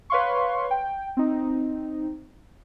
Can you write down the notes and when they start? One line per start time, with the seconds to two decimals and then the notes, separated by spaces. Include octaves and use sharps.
0.10 B4 C#5 F5 C6 C#6
0.71 G5
1.17 C4 D#4